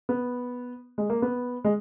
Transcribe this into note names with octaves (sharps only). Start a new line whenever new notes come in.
B3
G#3
A#3
B3
G#3